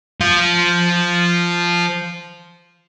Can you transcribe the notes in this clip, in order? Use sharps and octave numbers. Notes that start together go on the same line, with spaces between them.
F3 F5